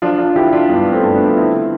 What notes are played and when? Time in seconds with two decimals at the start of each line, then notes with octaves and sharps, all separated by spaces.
0.02 F3 D4 F4
0.19 D4 F4
0.36 F3 E4 G4
0.53 D4 F4
0.70 G2 B3 D4
0.92 A3 C4
1.03 G2
1.15 B3 D4
1.36 D3 C4 E4